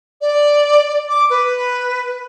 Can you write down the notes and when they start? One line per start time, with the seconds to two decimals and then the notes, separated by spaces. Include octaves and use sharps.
0.21 D5
1.09 D6
1.30 B4